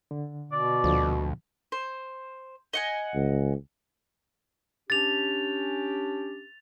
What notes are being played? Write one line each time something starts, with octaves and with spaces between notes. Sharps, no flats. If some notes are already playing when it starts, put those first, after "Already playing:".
D3
B2 D5
D2 A#2 D3 F3
C5
D#5 F#5 G#5
C#2
C#4 D4 G4 A6 F7